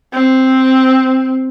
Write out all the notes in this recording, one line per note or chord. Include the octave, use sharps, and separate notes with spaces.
C4